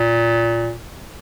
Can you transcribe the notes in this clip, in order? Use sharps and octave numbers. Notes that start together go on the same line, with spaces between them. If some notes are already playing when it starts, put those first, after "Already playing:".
Already playing: A#2